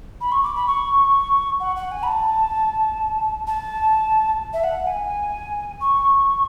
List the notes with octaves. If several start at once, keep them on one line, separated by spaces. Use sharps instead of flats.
B5
C#6
D6
B5
C#6
F#5
F#5
G#5
B5
A5
A5
E5
F#5
G#5
C#6